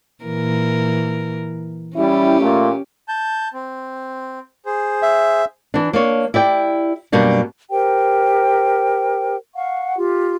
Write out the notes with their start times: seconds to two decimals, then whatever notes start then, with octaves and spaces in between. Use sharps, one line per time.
0.24 A#2 E3 A#4
1.97 G3 C#4 E4 G4
2.39 A#2 A3
3.08 A5 G6
3.54 C4
4.66 G#4 C5
5.03 E5
5.74 E3 D4
5.93 A#3 D4 C#5
6.34 E4 G4 D5 G5
7.12 F#2 B2 G3 A#3 D4
7.70 G4 A#4 C5 G5
9.55 F5 F#5 C#6
9.97 F4 G4